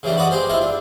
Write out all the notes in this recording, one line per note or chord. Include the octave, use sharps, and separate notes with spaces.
C#3 E3 G3 D4
F#4 B4 D5 D#5 F#5
G#3 G4 G#4 C5
C4 E4 F4 D#5 E5
D4